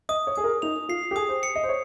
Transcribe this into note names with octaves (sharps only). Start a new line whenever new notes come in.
D#5 D#6
C#5
G#4 D#6
A#4
D#4 F7
F4 C7
G4
G#4 D#6
C5
C#7
D#5
C5
C#5